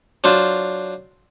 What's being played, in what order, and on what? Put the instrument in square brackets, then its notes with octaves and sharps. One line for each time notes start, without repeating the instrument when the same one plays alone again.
[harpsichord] F#3 D4 F4 C5